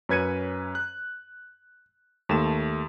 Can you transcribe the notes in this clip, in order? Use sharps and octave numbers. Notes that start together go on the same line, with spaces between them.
F#2 C#4 B4 G#6 C#7 D#7
F#6
D#2 A3 E7